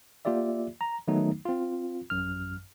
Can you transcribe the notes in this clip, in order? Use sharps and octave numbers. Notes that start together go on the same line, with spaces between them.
A#3 F4 G4 D5 E5
A#5
D#3 F#3 A3 B3 D#4
C4 F4
A1 F#2 F6